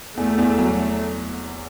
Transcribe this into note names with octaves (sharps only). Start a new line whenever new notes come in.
E2 A3
E2
F#3